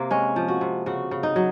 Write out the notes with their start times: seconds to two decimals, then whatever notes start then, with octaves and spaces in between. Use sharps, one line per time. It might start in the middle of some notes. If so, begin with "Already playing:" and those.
Already playing: C3 A#3
0.11 G#3 C#4
0.36 F3
0.48 F#4
0.61 C3
0.86 C#3 F#4
1.11 C#3
1.23 D#4
1.36 F#3